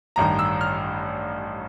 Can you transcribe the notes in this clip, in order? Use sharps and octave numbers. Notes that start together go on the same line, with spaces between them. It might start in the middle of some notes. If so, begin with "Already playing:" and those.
A1 G2 D#3 A#5
E6
F6